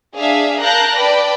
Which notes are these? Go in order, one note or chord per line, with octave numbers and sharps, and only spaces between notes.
D4 G#4 E5 F5
A#4 F5 A5 F#6 G6 A#6
B4 D5 G5 A5 B5